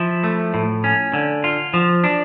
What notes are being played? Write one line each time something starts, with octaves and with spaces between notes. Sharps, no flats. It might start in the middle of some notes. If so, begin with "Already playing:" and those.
Already playing: F3 E4
A3
A2
C#4
D3
F4
F3
D4